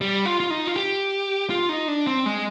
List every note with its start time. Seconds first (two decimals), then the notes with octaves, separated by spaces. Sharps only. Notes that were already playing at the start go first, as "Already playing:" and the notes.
0.01 G3
0.26 F4
0.40 F4
0.50 D#4
0.67 F4
0.76 G4
1.50 F4
1.69 D#4
1.88 D4
2.07 C4
2.26 G#3